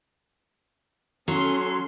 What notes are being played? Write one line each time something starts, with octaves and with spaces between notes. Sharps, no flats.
F#3 C#4 A4 C6